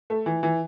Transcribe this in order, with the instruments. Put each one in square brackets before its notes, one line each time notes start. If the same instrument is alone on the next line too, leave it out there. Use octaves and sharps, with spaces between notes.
[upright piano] A3
E3
E3